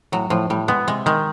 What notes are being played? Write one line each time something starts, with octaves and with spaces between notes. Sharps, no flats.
A2 F#3
A2 F3
A2 G3
G#3 B3
C3 G#3
D#3 G#3